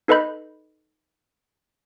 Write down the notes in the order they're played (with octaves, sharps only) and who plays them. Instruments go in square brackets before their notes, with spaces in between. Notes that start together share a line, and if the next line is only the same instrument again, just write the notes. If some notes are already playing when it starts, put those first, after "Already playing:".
[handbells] D#4 A4 B4 D#5 B5 G6